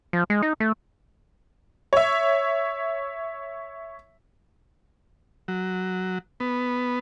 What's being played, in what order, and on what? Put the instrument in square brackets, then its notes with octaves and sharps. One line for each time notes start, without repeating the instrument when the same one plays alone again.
[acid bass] F3
G#3
D#4
A3
[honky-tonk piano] C#5 E5
[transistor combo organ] F#3
B3